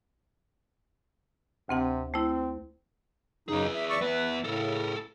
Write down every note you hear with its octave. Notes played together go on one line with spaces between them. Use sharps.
D2 C3 C4 F#5
A3 C4 E4
F#2 C#3 D#4 G#4 B4
E5
D5 E5 C#6
B3 B4 E5
A2 C#3 A4 A#4